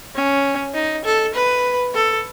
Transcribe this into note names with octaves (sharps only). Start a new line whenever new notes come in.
C#4
D#4
A4
B4
A4